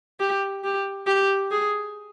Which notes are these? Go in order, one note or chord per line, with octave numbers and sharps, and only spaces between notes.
G4
G4
G4
G#4